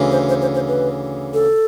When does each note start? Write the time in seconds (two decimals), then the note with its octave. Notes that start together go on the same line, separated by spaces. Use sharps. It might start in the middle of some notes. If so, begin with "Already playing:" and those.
Already playing: D2 C#3 E3
0.11 C5
0.29 C5
0.42 C5
0.55 C5
0.68 B4
1.34 A4